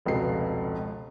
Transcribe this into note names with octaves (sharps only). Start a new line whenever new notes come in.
F1 C#2 B2 C7